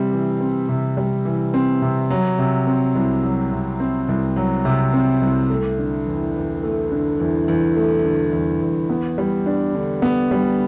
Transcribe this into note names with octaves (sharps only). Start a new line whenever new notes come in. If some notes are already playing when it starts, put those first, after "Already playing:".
Already playing: C3 E3 G3 C4
E3
C4
C3
G3
E3
C4
C3
F#3
C3
C4
C2
F#3
C3
C4
C2
F#3
C3
C4
C2
A3
D3
E2
E2
A3
D3
E2
E2
A3
D3
E2
E2
B3
G3
D4
D3
B3
G3